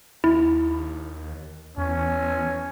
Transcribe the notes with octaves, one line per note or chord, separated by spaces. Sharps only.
D#2 E4
E2 C#4